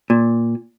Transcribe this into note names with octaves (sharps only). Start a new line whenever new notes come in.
A#2